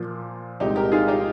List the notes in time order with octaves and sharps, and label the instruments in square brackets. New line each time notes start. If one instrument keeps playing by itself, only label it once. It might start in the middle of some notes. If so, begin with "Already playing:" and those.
Already playing: [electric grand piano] A#2 F3 A#3 F4
[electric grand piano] C2 A#2 G#3 C4 [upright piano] D#4 G4
[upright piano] G4 A#4
F4 G#4
D#4 G4